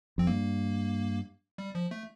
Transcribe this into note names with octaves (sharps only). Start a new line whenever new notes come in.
F2 C4
G2 A#3
G3
F3
A3